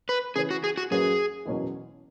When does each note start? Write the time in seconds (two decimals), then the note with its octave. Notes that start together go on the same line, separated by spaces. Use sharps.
0.09 B4
0.36 C#3 E3 C#4 G#4
0.51 F#4
0.64 G#4
0.77 F#4
0.91 F#2 F#3 C#4 F#4 G#4 B4
1.45 F#1 E2 B2 F#3 C#4